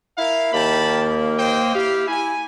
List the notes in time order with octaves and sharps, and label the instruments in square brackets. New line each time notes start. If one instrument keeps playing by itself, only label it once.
[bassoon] E4 [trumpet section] A#4 F5
[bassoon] D#2 [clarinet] A#3 [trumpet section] G5 A5 B5
[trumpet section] C5 D#5 G5
[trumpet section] E4 F5 [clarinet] G4
[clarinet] E4 [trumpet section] G#5